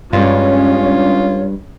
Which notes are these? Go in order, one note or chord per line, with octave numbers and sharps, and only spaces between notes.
G2 G#3 C#4 F4 C#5